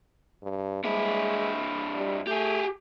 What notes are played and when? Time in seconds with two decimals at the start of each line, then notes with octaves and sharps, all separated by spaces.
0.43 G2
0.84 G2 G#3 E4
1.95 G3
2.27 A3 G4 G#4